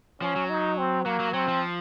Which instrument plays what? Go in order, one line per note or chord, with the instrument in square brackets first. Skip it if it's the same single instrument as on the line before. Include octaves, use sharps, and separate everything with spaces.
[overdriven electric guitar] F3 [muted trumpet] C#4
[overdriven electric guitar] F#3
[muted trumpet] D#4
C4
[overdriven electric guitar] F#3 [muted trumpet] A#3
[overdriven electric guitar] F#3
[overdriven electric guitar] F#3 [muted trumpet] C4
[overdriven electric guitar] F3